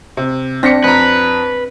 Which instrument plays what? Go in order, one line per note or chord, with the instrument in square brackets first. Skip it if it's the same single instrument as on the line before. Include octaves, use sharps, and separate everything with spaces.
[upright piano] C3
[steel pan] C4 D4 [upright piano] A#6 B6 C#7
[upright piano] F2 A#5 [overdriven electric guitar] B4